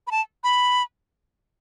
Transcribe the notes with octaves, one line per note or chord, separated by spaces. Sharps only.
B5
A5
B5